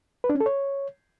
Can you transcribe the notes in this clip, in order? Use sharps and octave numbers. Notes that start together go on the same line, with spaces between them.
B4
D4
C#4
A4
C#5